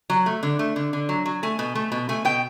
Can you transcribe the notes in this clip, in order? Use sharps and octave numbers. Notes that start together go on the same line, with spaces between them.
F#3
A3
D3
A3
D3
D3
F#3
F#3
A3 G#5
B2
A3
B2
A3 G#5
B2 G5